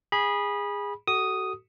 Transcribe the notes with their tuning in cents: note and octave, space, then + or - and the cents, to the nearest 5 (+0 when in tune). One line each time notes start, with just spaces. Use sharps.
G#4 -20 B5 -20
F#4 +30 A4 +0 D#6 +0